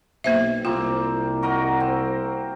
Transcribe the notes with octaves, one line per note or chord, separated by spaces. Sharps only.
B1 A#3 C5 E5
C2 A#3 C4 F4
F#4 A#4 D#5
C4